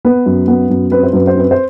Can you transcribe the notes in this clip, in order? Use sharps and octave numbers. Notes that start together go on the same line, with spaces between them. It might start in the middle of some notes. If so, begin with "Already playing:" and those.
B3 B4
F#2
B3
F#2
C4 B4
C5
F#2 B4
C5
C4 B4
C5